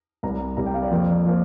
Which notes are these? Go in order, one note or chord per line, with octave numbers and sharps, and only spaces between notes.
C2 C3 G3 A#5
C2 C3 G3 A#5
G5
F5
D5
F2 F3 A#3
F3 A#3